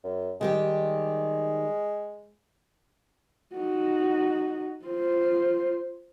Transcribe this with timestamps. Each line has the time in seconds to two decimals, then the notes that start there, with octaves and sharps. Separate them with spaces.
0.04 F#2
0.41 D#3 G3 G#3 G4
3.56 D#4 F#4
4.85 F4 C5